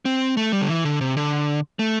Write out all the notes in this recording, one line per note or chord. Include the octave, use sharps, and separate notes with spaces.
C4
A3
G3
D3
E3
D3
C3
D3
A3